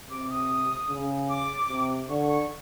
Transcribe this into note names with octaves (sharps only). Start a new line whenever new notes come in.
C3 D6
D#6
C#3
D6
C3
D3 C#6
C#6